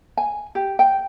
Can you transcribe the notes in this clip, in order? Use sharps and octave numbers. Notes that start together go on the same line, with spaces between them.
G#5
G4
G5